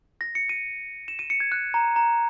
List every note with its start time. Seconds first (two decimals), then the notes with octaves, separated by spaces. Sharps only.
0.21 A#6
0.35 C#7
0.49 D#7
1.08 E7
1.19 D#7
1.30 C#7
1.40 G#6
1.52 F#6
1.74 A#5
1.96 A#5